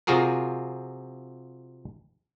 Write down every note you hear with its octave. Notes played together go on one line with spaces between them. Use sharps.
C3 F3 F4 F#4 G#4 A#4